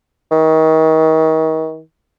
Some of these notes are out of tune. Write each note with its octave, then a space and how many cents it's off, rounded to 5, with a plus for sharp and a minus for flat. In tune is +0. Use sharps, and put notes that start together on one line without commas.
D#3 +35